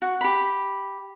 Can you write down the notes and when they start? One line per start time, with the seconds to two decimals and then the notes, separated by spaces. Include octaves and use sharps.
0.02 F#4
0.21 G4 B5